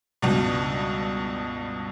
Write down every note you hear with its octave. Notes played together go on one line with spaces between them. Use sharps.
C#2 G2 B2